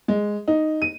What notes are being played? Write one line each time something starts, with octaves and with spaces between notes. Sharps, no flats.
G#3
D#4
D#7